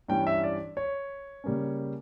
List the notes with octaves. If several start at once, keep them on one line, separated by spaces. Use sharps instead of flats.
G2 E3 G3 C#4 G5
E5
D5
C#5
C#3 G3 A#3 C#4